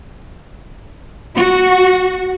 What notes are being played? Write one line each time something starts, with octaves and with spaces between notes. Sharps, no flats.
F#4